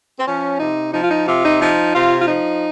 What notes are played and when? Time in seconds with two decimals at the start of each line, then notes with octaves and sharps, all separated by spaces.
0.19 C4
0.26 F3 C#4
0.59 C3 D#4
0.93 F3 D#4
1.02 F4
1.10 D#4
1.26 C3 F4
1.44 D#4
1.60 F3 D#4
1.94 C3 F4
2.20 F4
2.27 F3 D#4